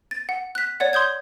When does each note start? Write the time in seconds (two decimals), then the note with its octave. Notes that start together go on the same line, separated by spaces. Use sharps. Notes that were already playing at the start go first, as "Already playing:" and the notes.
0.11 A6
0.29 F#5
0.55 F#6 B6
0.80 C#5 D5 F#5
0.93 C6 D#6 G6 G#6